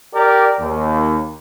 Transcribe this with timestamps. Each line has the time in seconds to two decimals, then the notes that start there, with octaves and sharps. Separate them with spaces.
0.14 G4 A#4 D5
0.60 D#2